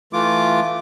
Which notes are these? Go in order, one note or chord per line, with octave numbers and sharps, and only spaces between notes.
E3 A3 F4 D6